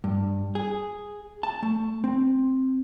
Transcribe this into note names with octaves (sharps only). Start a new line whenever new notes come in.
G2
G#4
A5
A3
C4